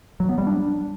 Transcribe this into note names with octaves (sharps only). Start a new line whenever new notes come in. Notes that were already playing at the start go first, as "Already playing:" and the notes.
F#3
B3
G3
D4